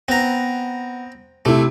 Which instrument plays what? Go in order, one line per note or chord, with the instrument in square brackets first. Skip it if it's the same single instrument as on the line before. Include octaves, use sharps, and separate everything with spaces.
[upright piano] B3 [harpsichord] C4 A#5
[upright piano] C3 E4 [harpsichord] A3